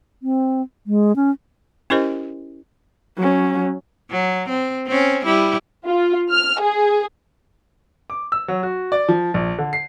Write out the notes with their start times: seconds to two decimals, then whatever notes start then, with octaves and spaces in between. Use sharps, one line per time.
0.23 C4
0.87 G#3
1.16 C#4
1.90 C#4 E4 G4 A#4 C5 D#5
3.17 F#3 C#4
4.11 F#3
4.49 C4
4.87 C4 C#4
5.25 G3 E4
5.85 F4
6.30 F6
6.60 G#4
8.10 D6
8.32 E6
8.48 F#3
8.63 F#4
8.92 D5
9.08 F3
9.34 A#1
9.58 D3
9.73 C7